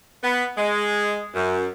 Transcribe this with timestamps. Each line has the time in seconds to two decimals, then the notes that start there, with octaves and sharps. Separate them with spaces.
0.23 B3
0.58 G#3
1.35 F#2